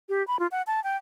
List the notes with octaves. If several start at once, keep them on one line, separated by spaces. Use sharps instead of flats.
G4
B5
F4
F#5
A5
G5